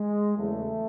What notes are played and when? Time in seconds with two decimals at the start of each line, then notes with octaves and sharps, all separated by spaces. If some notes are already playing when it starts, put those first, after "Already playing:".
Already playing: G#3
0.37 E2 C#3 F#3 A3